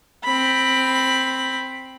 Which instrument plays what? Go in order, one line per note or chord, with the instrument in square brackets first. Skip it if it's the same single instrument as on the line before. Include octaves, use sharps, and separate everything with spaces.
[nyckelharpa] C4 B5